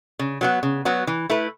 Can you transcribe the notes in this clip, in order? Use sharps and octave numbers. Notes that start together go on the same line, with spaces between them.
C#3
F#3 B3 F#4
C#3
F#3 B3 F#4
E3
A3 E4 B4